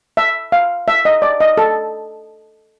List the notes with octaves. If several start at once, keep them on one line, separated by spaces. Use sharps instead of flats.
E5
F5
E5
D#5
D5
D#5
A4